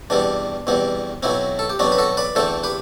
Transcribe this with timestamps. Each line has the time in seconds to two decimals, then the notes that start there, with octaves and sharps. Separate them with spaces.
0.10 E2 B2 G3 C4 D4
0.67 E2 B2 G3 C4
1.23 B1 B2 F#3 C4 E4
1.59 A4
1.70 G4
1.79 B1 B2 F#3 C4 D4 F#4
1.92 B4
1.98 F#4 A4
2.17 B4 D5
2.35 E2 D3 A3 C4 A4 C5
2.64 G4 B4